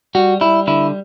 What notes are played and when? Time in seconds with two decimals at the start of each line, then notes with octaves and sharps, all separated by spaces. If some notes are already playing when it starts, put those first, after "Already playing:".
0.15 G3 F#4
0.41 G3 E4
0.67 D3 E4